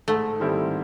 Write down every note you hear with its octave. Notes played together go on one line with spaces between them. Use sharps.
G#2 A3
D#3 G3 C4 E4